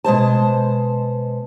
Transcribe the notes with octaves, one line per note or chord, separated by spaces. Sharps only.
B2 G#3 C5 A5